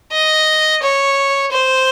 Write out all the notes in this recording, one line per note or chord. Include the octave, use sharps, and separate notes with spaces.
D#5
C#5
C5